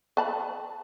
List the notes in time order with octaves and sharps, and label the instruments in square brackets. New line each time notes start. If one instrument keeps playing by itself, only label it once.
[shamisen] B4 A5 B5